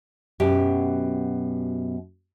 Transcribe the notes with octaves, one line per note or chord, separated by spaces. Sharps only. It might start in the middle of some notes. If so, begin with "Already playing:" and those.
F#2 B2 G4